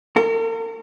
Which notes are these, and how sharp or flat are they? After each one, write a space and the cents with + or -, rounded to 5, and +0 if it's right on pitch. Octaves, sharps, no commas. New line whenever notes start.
A#4 -45